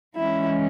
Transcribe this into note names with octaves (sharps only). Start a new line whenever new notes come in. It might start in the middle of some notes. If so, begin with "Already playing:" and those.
E3 G#3 C#4 E4